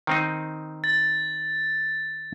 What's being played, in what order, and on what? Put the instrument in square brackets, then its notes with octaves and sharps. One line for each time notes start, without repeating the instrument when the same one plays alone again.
[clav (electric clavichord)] D#3 C4 D#4
[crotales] A6